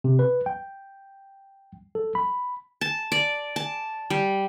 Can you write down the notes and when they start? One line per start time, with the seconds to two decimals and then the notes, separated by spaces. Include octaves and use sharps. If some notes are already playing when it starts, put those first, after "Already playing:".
0.04 C3
0.19 B4
0.46 G5
1.95 A4
2.15 B5
2.81 A5
3.12 D5
3.56 A5
4.10 G3